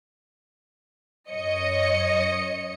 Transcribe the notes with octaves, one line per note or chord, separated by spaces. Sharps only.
F#2 C#5 D#5 C#7